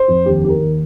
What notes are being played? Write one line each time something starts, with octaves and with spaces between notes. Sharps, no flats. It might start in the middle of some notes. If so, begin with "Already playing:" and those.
Already playing: C5
F2
D#2 G4
D#3 G4
A#4
D#2